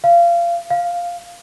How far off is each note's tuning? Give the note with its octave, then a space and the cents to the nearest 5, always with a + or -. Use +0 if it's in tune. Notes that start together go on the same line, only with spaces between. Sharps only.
F5 -25
F5 +0